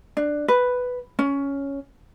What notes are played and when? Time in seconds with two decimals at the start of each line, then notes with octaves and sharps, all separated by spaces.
0.17 D4
0.48 B4
1.19 C#4